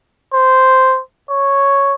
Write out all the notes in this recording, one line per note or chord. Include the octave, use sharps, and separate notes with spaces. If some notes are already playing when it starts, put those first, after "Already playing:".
C5
C#5